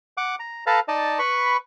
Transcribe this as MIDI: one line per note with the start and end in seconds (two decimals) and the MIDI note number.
0.17 0.35 78
0.17 0.35 86
0.40 0.64 82
0.66 0.80 69
0.66 0.80 71
0.66 0.80 77
0.66 0.80 81
0.66 0.80 82
0.88 1.19 63
0.88 1.19 74
0.88 1.19 75
0.88 1.19 81
1.19 1.57 71
1.19 1.57 83
1.19 1.57 85